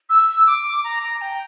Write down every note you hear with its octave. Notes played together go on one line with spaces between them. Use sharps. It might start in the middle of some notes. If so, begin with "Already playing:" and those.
E6
D6
A#5
A#5
G5